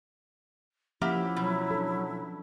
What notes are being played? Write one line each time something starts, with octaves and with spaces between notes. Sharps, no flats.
F3 A#3 C#4 E4 G4 E5 F#5
B2 F#3
D4 A4